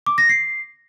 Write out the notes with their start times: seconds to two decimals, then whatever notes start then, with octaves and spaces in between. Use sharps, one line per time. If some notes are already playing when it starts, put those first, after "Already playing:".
0.06 D6
0.18 A#6
0.29 C7